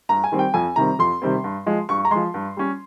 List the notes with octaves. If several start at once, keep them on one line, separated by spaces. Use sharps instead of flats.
G2 A#5
G#5
D#3 G3 C4
G5
F2 G#5
C3 D#3 G3 C4 A#5
F2 C6
C3 D#3 G3 C4
G2
F3 G#3
G2 C#6
A#5
F3 G#3 C6
G2
G3 C#4